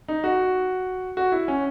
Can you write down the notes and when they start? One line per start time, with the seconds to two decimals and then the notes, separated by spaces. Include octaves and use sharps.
0.08 D#4
0.24 F#4
1.17 F#4
1.32 E4
1.48 C#4